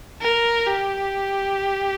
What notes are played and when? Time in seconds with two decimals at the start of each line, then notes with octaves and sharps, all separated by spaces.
0.21 A#4
0.67 G4